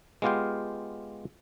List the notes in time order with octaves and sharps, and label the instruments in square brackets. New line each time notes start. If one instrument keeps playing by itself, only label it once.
[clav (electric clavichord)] G#3 B3 F4 G4 F5 G5